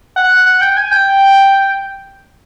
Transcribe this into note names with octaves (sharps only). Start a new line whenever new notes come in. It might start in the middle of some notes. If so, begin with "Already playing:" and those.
F#5
F#5
G5
G#5
G5